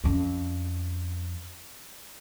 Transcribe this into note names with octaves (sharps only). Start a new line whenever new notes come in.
F2 C#4